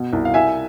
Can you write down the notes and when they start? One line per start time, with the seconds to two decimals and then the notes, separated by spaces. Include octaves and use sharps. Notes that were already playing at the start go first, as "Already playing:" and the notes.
Already playing: B2
0.13 C2
0.25 F5
0.34 C2 E5 G#5